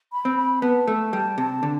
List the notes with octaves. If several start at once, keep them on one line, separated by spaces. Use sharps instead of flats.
B5
C4
B5
B3 A5
A3
G3
C3
D3